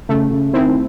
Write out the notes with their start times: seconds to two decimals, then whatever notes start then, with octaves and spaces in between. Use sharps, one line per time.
0.09 C#3 A3
0.31 C#3
0.53 D#3 C4 E4